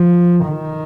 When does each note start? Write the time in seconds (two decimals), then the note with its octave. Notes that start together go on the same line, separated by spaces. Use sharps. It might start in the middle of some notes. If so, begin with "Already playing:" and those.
Already playing: F3
0.47 D#3